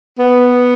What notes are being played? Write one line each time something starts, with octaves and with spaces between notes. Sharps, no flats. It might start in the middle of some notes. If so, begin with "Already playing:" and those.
B3